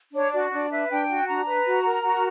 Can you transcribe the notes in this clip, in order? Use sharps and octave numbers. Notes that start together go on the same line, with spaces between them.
D4 C#5
F#4 D5
D4 D5
B4 E5
D4 G5
F#4
D4 A#5
B4
F#4
A#4
F#4